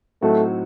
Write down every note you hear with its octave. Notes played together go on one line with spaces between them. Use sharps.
A2 F#3 A3 C4 D#4 F#4